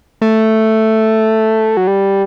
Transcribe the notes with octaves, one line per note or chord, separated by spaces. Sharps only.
A3
F#3
G3